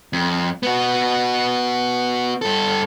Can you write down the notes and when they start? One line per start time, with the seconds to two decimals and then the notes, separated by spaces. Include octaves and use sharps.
0.13 F2
0.63 B3 F#4
2.42 G2 A4